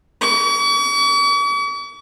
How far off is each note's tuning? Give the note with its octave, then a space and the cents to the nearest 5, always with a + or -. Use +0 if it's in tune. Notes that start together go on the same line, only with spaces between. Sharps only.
C#6 +45